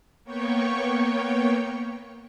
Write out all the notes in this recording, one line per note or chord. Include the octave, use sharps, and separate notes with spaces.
A#3 B3 C#5 G5 C#6